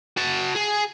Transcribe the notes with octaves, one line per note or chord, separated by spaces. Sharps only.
F#4 A5
G#4